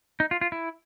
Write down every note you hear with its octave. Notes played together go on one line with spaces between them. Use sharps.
D#4
F4
F4
E4